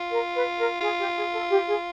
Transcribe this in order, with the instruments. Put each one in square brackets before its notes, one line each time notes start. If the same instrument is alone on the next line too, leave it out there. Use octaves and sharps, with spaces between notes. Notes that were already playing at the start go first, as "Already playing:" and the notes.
Already playing: [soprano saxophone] F4
[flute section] A#4
B4
A#4
[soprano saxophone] F4 [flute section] G#4
[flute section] G4
G#4
A4
G4
G#4